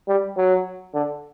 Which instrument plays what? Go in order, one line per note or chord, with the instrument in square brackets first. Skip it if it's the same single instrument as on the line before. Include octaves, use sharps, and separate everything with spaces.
[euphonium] G3
F#3
D3